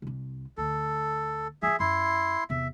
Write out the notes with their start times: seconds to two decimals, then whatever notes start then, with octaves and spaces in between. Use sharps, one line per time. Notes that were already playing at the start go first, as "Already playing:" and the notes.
0.02 C2 C3
0.58 D2 A4
1.62 F3 F4 G#4 E5
1.80 F#2 E4 C6
2.50 E2 C3 E5